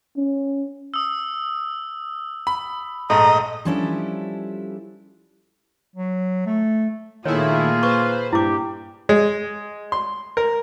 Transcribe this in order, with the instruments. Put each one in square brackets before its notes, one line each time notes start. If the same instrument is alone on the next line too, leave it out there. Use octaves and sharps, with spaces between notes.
[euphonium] C#4
[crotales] D#6 E6
[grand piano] B5
[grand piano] A#1 G#2 A3 [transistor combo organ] D#5 [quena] A#5
[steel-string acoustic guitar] F3 G3 C#4 D4 E4 A4
[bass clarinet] F#3
A3
[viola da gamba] A#2 A#3 G#4 [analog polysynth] D#3 A3 E4 [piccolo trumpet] F4 [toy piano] C#5
[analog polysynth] B4 C5 [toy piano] C#6
[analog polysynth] G2 [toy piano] E4 D6 [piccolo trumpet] G4
[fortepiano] G#3
C6
A#4